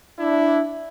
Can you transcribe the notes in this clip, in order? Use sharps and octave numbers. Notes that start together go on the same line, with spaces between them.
D4 E4